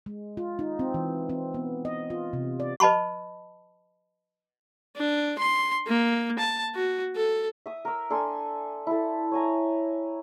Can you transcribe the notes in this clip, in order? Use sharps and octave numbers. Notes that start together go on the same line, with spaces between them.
G#3
F4
D#4
C4
E3
C4
B3
D#5
F4
C3
D5
B4 D#5 A5 B5 C#6
D4
C6
A#3
A5
F#4
A4
E5 D#6
A#4 E6
D4 A4 G#5 C6
E4 A4
C#5 G#5 A#5